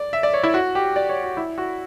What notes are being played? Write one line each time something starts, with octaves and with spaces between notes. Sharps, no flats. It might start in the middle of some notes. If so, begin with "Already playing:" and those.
Already playing: D5
E5
D5
C#5
E4
F#4
G4
D5
C#5
F#4
E4
F#4